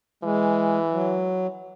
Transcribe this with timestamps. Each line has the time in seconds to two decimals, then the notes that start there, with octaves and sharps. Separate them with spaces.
0.23 E3 G#3
0.92 F#3